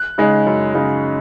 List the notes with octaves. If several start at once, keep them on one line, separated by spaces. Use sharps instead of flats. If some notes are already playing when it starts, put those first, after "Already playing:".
Already playing: F#6
C#3 G#3 D#4
F#2
C#3 G#3 D#4